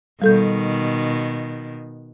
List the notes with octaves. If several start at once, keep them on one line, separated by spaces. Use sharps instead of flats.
B2 D#3 G3 A4 G6